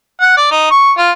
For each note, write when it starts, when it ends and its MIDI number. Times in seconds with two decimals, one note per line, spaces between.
0.21 0.34 78
0.37 0.47 74
0.51 0.66 63
0.71 0.91 85
0.98 1.11 65